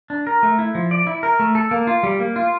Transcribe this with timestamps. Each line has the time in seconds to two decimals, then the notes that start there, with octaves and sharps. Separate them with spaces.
0.10 D4
0.27 A#4
0.43 A3
0.59 E4
0.75 F3
0.91 D5
1.07 E4
1.23 A#4
1.39 A3
1.55 A4
1.71 A#3
1.87 F4
2.03 G3
2.20 A#3
2.36 F4